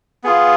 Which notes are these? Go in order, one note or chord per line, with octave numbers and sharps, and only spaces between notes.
B3 F4 G#4